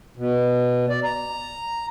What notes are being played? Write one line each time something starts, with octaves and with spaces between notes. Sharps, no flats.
B2
D5
A#5